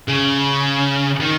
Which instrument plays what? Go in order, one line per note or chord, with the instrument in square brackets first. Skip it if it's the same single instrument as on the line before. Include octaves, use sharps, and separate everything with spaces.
[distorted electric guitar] C#3
D#3